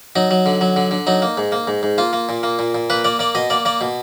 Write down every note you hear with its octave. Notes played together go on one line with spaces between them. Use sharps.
F#3 D#4
F#3
D3
F#3
D3
D3
F#3 D#4
A#3
G#2
A#3
G#2
G#2
A#3 F4
A#3
A#2
A#3
A#2
A#2
A#3 B4
A#3 D5
A#3 D5
B2 D#5
A#3 D5
A#3 D5
B2